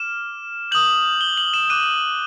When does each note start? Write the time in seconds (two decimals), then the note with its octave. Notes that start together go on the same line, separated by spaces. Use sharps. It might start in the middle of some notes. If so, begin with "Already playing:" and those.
Already playing: D6 F6 E7
0.72 D#6 G6 F#7
1.21 G7
1.37 F#7
1.54 E7
1.70 D6 F#6 D#7